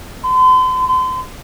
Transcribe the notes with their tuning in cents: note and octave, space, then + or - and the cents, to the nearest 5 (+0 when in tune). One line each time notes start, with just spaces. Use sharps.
C6 -40
C6 -35